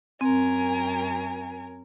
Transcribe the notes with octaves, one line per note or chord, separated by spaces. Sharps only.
F#2 C4 A#4 G#5